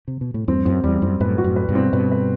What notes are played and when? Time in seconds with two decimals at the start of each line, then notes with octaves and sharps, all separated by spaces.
0.08 C3
0.21 B2
0.34 A2
0.48 E2 G2 C4
0.65 F#2 C4
0.84 E2 G3
1.02 F#2 C4
1.20 F#2 A2 B4
1.38 F#4
1.44 F#2 A2
1.56 B4
1.69 G2 B2
1.75 C4
1.93 G2 B2 B4
2.12 B4